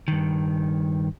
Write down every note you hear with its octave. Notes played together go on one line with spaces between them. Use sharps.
G2 D#3